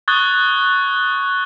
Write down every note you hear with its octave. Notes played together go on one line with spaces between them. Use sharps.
C#6 D#6 F#6 G#6 A6 G7